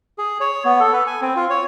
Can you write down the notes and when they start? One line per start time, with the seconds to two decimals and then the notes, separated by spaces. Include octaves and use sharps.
0.18 G#4
0.40 C#5
0.65 B3
0.80 A4
0.93 B4
1.07 G#5
1.22 C4
1.36 F4
1.50 C#5